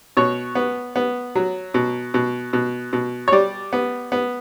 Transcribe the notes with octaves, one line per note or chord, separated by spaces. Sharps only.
B2 C#5
B3
B3
F#3
B2
B2
B2
B2
C#5
G3 D5
B3
B3